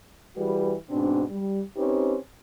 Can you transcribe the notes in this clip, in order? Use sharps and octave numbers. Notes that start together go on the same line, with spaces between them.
E3 G3 F#4 G#4 B4
G#2 B2 C4 D4
G3
C4 C#4 D#4 G4 B4 C5